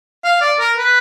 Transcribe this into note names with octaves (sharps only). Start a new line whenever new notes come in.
F5
D5
A#4
B4